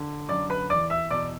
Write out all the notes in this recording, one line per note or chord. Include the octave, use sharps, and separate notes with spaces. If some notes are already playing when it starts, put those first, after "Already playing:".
Already playing: D3
F#2 D3 D5 D6
B4 B5
E2 E3 D5 D6
E5 E6
E2 B2 D5 D6